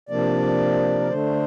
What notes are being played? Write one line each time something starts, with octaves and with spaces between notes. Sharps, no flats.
C3 F3 A#3 D4 D5
A#4
D3 A3 D4 C5